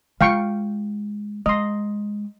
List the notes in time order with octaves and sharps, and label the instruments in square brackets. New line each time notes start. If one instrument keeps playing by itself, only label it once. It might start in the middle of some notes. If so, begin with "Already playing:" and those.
[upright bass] G#3 F4 [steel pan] F5 G5 C#6
[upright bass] G#3 [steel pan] D#5 C6